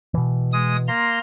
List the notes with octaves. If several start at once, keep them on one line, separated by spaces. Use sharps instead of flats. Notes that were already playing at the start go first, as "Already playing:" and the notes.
B2 E3
G#3 D#6
A#3 A#5 C6